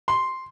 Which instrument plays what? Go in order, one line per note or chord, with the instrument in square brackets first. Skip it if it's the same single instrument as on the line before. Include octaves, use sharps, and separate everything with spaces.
[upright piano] C6